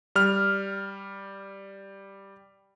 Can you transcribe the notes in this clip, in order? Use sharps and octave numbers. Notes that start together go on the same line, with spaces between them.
G3 F6